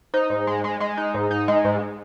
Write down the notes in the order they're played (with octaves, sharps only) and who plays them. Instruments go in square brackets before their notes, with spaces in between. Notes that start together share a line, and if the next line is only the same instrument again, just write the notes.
[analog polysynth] D#4 [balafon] C5
[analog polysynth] G#2
G#3
G#3
[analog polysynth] G#3 [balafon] D#5
[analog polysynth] D#4
G#2
D#4
[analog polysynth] G#3 [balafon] D#5
[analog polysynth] G#2